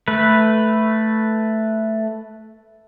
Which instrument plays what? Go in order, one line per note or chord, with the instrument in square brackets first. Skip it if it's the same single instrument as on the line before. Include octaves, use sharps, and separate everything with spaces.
[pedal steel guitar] A3 B4